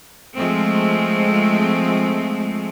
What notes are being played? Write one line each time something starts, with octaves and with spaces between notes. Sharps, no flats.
F3 G#3 A3 C4